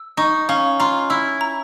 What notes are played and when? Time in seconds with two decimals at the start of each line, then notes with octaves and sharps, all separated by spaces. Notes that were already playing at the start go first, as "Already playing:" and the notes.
Already playing: E6
0.17 D#4 C#6
0.49 C#4 F5
0.80 F4 A#5
1.10 E4 E6
1.41 A#5